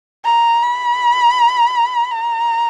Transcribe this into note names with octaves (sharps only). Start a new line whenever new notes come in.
A#5
B5
A#5